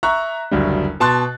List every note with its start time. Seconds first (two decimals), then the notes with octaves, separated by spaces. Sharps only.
0.03 E5 A#5 C#6 F#6
0.51 F#1 D2 F#3 G3
1.00 B2 A5 C6 F#6 A6